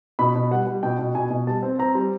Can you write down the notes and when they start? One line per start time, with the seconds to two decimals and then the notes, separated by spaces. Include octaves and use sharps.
0.19 B2 B5
0.36 B2
0.51 G3 F#5
0.67 G3
0.83 B2 G5
0.99 B2
1.15 B2 G#5
1.30 B2
1.47 G3 A5
1.63 C4
1.79 C4 A#5
1.95 G3